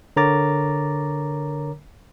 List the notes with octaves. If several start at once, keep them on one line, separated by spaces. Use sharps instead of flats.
D3 A#4 C#5 A#5 D6 A6